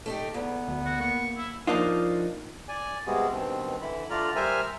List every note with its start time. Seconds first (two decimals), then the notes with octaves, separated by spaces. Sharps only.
0.06 A3 D#4 G4
0.34 E2 B3
0.68 D2
0.86 F#4
1.00 A#3 C#6
1.37 E4
1.67 F3 A#3 D4 D#4 F4
2.68 D5 G#5
3.07 C3 G3 G#3 B3 F#4 G#4
3.31 G2 B2 D#3 C4
3.82 D3 E3 E4 B5
4.10 D3 A3 F4 D5 A#5 F6
4.36 G3 A#4 C5 E5 G#5 F6